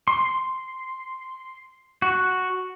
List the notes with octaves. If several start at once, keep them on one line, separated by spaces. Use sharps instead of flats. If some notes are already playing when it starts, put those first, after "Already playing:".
C6
F#4